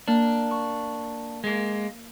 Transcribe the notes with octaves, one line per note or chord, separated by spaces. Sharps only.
A#3 D4
C#6
G#3 A#3